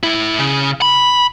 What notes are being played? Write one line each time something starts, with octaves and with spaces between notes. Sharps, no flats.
A2 E4
C#3
B5